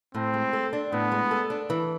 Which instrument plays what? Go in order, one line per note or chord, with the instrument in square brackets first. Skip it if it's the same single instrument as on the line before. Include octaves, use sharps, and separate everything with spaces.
[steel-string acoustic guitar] A2 [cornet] C4
[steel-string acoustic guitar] G#3
A4
D4
[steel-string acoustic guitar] A2 [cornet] B3
[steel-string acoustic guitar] G#3
A4
D4
E3